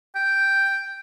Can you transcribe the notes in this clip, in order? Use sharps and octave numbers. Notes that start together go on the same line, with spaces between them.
G5